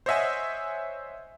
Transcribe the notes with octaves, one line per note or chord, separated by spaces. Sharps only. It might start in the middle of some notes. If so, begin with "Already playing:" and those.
C5 C#5 D#5 E5 F#5 G#5